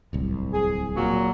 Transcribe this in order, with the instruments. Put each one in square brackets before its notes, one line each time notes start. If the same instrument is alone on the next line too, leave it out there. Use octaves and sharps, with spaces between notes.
[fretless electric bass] D1 C2
[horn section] G#4
A#2 F#3